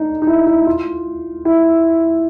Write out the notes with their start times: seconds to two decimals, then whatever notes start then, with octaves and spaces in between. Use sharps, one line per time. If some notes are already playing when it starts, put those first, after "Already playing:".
Already playing: D4 D#4
0.22 D#4
0.27 E4
0.46 E4
0.66 F4
1.45 E4